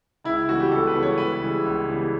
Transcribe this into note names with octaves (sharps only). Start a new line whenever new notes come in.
C#2 E4
E4
C#3 E3 G3 B3 F#4
G4
C#2 A4
B4
C#3 E3 G3 B3
C#5
C#2 B4
C#3 E3 G3 B3
C#2
C#3 E3 G3 B3